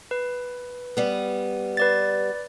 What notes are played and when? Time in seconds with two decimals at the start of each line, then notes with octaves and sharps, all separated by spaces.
0.11 B4
0.97 G3 B3
1.77 B4 D5 A6